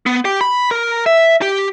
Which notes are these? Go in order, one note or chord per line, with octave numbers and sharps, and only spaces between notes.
B3
G4
B5
A#4
E5
G4